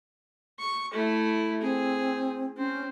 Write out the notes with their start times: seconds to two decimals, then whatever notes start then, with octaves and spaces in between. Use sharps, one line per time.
0.60 C#6
0.92 A3 E4
1.62 C4 G#4
2.58 C4 C#4